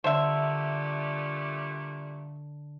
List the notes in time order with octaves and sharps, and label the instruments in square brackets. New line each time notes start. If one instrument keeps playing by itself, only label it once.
[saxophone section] A#2 G3 A3 [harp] D3 [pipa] C5 E5